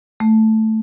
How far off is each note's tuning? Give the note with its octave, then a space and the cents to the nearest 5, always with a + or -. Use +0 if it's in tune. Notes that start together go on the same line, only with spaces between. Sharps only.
A3 +0